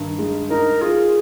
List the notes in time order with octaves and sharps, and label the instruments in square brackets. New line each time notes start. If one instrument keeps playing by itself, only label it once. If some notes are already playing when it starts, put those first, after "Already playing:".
Already playing: [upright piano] G2 D#3
G#3
[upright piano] D#4 [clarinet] A#4
[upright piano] F4 [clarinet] G#4